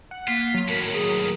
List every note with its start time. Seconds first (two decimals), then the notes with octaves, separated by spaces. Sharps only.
0.11 F#5
0.28 A#3 F4 B6
0.54 F#3
0.68 D#2 A2 A#4
0.93 G#4 A#4